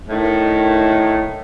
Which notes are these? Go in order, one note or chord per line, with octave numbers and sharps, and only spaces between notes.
A2 D#3